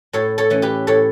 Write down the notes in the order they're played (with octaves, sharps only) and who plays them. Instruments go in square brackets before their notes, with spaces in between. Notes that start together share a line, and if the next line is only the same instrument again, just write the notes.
[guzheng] A2 A4 C#5
A4 C#5
E3 A3 C#4
G4 B4
A2 A4 C#5